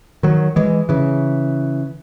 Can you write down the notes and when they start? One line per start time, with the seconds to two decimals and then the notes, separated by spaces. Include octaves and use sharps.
0.23 D#3 F#3
0.56 E3 G#3
0.89 C#3 E3